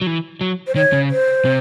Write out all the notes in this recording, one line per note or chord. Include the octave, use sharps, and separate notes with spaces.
F#3
E3
F#3
C5
D#3 C#5
C#3
C5
C3